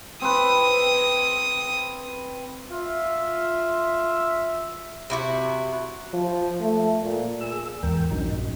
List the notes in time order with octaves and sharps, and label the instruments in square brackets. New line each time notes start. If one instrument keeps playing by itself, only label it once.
[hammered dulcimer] C4 B4 [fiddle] D#6
[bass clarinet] F4 [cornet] E5
[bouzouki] C3 E4 F#4
[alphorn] F3
A3
A#2
[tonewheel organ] G#4 E6
[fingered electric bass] E2 [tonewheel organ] G#2 A#4 G5
[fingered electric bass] A#1 G2 C#4 [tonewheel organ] F#3 D#4